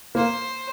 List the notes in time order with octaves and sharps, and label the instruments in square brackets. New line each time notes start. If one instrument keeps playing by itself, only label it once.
[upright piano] A#3 [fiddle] C5